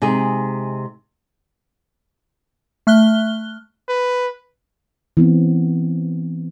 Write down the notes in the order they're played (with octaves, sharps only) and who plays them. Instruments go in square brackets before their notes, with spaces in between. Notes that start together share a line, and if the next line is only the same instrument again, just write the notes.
[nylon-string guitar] C3 G#3 D#4 G#4
[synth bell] A3 F6 F#6 G7
[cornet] B4
[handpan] E3 B3 C4